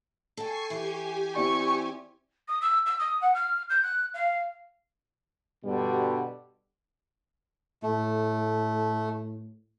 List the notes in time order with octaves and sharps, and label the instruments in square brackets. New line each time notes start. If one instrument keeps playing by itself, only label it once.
[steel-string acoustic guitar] A4 G5 [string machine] G#5 C#6 C7
[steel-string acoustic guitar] E3 [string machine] G4 G#5
[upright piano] C4 E4 D5 [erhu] C#6
[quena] D#6
E6
E6
D#6
F#5
F6
G6
F#6
F5
[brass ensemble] G2 B2 D3 G3
[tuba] A2 [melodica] A3